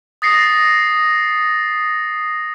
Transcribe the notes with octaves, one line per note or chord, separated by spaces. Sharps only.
D#6 A6 A#6 C7 C#7